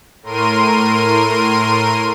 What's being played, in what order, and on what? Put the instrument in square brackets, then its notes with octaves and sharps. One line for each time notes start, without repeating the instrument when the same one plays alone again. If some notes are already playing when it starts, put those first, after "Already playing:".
[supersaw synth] A2 A#4 C6 D#7